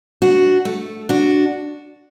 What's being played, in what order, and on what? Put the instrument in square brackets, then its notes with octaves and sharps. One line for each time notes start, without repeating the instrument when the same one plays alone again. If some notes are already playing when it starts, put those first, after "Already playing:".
[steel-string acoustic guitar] D4 F#4
A3
D4 F#4